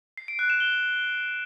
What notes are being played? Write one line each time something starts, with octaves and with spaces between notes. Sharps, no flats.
C7
D7
F#6
E7
G7